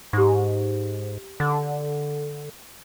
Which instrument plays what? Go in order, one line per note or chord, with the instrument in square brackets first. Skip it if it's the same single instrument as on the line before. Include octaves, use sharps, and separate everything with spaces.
[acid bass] G#2 [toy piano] G4 C#6
[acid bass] D3